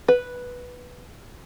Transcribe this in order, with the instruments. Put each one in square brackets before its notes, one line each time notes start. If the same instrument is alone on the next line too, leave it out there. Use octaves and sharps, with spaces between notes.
[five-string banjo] B4